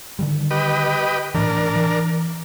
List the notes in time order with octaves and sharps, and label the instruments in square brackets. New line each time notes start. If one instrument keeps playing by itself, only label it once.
[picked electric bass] D3 D#3 G3
[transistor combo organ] G4 B4 D#5
[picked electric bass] A2 E3 [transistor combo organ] D4 A#4
[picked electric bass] E3